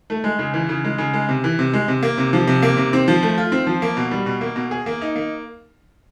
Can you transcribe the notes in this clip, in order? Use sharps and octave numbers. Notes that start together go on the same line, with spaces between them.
A3
G#3
C#3
E3
C#3
G#3
C#3
G#3
C3
E3
C3
G#3
C3
A#3
C3
F3
C3
A#3
C3
C4
F3
A3
F4
C4
F3
A#3
B2
G3
B2
A#3
B2
G#4
A#3
D#4
A#3